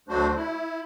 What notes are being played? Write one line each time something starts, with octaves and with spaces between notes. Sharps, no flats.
D2 F#3 A3 D4 F#4 C5
E4